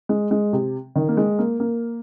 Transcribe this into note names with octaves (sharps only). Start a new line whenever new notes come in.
G#3
G#3
C3
D#3
A#3
G#3
A#3
A#3